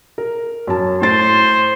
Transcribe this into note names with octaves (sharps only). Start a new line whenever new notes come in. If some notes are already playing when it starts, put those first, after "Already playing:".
A#4
F#2 C#4 A5
A2 C5 A6 C7